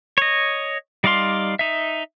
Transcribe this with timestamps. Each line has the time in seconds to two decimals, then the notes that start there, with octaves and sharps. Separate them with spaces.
0.18 C#5 D#5
1.04 G3 D#4 D5 F5 C6
1.59 D#4 E5